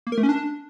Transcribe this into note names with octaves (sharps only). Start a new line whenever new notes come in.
A#3
A#4
A3
C#4
D4